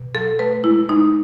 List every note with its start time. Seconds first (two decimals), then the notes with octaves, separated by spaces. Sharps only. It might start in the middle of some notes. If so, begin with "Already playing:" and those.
Already playing: B2
0.14 F#3 A4
0.39 A3 B4
0.64 G#3 E4
0.89 G#3 D#4